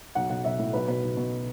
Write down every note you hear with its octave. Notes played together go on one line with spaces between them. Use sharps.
B1 F#5
B1 F#5
B1 E5
A2
B1 B4
B2 B4
B1
B2